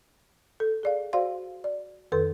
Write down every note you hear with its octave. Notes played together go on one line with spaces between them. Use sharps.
A4
G#4 D5 F5
F#4 C5 D5 F5 C6
D5
F2 D#3 A4 B4 C6